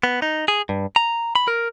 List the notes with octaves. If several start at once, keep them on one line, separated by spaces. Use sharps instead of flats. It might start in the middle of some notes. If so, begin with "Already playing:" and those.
B3
D#4
G#4
G2
A#5
B5
A#4